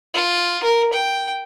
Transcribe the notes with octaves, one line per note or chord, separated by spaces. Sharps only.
F4
A#4
G5